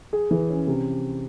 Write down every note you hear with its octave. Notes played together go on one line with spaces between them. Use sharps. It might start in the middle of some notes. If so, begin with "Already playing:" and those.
G#4
E3
C#4
C3